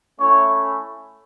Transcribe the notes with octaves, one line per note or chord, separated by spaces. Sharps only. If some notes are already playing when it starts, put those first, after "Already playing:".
A3 C#4 E4 C#5